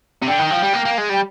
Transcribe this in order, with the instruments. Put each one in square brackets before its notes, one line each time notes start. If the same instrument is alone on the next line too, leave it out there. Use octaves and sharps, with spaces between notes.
[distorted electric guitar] C3
[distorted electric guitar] D3 [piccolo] G5
[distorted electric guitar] D#3
F3
G3
A#3
A#3
G#3
[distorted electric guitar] G3 [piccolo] G5